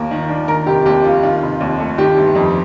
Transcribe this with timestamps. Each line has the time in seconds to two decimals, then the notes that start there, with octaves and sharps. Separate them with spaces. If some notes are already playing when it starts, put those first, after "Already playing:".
Already playing: D#2 A#3 A#4
0.11 D#3
0.29 D4
0.48 D#3 A#4
0.66 F1 G4
0.85 D#2 G4
1.05 A#3 F4
1.23 D#3 F4
1.42 F1
1.61 D#2
1.80 A3
1.98 D#3 G4
2.17 G1
2.35 F2